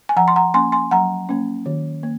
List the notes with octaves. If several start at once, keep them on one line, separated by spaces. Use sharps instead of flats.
G#5
F3 F#5 A#5
C6
F#5 A#5
A#3 C#4 G#5 C6
G#5 C6
F#3 F#5 A#5
A#3 C#4
D#3
A#3